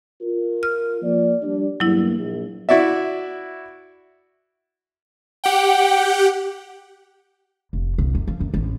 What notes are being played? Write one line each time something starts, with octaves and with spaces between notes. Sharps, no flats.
F4 A#4
F6
F3 A#3 D5
G3 D4 D5
E2 G2 F#3 A#3 E4
A#1
E4 F#4 D5 E5
G4 F#5 G5
F1
C2
F#2
F3
F#2
A1